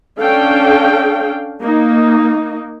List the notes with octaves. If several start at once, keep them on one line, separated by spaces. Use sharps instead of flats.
C#4 D4 A4 F5 G5
A#3 D#4